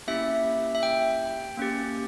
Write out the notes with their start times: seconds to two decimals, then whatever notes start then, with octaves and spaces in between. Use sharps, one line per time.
0.07 A#3 C#4 E4 G4 E5
0.75 E5
0.83 G5
1.57 A#3 C#4 G4